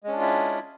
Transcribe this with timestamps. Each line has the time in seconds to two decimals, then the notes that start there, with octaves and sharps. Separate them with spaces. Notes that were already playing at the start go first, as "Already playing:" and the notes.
0.03 G#3
0.08 C#4
0.12 D4
0.17 F4
0.21 E4